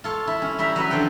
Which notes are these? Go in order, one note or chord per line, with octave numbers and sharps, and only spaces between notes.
F4 A4 C#5
E4
C#4
G3 E4 E5 A#5
F#3 F#4 B4
D3 F3 C5 F#5 G5